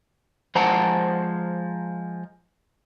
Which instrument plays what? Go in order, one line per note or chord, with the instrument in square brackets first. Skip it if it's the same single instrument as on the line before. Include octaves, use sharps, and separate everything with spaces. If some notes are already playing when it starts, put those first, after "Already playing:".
[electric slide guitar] F3 G#3 C5 F#5 A5 A#5